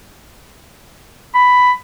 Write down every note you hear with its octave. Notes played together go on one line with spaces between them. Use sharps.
B5